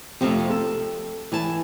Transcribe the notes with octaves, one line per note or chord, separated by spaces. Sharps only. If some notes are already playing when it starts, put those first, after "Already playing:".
F2 C3 F3 A3 F4
A4
E3 G#5 A5